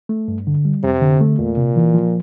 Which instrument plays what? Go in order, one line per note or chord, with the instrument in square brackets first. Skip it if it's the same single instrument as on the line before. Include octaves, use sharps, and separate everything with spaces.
[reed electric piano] A3
G2
D3
G3
[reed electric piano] F2 [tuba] C3
[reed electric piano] D3
A3
[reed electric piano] E2 [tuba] A#2
[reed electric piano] C3
E3
F3